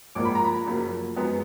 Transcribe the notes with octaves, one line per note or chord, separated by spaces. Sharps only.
A#1 G#2 F3 A#3 D6
B5
A#5
B5
F#1 F#2 F3 A#3
F#2 F3 G#3 B3